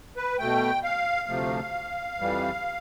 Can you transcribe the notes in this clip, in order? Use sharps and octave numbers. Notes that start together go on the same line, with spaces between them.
B4
B2 A3 G5
F5
D2 C3 F3 A3
F2 E3 G3